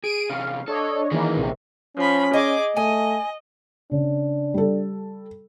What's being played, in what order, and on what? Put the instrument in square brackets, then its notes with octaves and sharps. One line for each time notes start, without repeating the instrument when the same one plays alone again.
[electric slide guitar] G#4 [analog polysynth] D7 D#7
[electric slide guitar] C3 E3 C#4 [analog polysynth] F5
[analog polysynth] D4 C#5 D#5 [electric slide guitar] A4
[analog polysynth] D#3 E3 A#3 [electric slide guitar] C#4 G#4 A#4
[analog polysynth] A#1 C3
[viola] F3 B5 [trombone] C#4
[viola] G#4 D6 [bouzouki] D#5
[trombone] A3 [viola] D#5 [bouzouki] G#5
[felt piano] C#3 [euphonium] D4
[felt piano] G3 A4